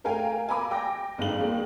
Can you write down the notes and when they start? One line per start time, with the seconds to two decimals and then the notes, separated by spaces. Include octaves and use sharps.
0.04 A3 A#4 F5 G5 G#5
0.48 F5 G#5 A#5 B5 D6
0.71 G5 D6 A#6
1.18 G1 F2 G#2 F5 F#7
1.39 D#2 G#3 A#3